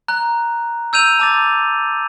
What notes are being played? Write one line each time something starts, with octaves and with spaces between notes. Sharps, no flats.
A#5 F#6
E6 G6 D#7 F7
A5 D6 A6